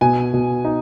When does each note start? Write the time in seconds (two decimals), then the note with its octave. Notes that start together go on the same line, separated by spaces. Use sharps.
0.01 B2 G#5
0.34 B2
0.65 D#4